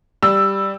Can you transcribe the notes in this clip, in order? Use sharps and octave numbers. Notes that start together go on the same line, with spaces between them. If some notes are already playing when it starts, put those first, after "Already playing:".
G3 E6